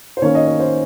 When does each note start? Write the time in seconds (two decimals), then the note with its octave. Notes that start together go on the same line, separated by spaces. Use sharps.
0.17 C5
0.22 D#3 A#3 C#4 C#5
0.35 D#5
0.48 C#5
0.60 C5